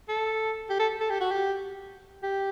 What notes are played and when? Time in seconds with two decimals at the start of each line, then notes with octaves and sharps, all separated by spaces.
0.09 A4
0.70 G4
0.80 A4
1.01 A4
1.10 G4
1.21 F#4
1.31 G4
2.23 G4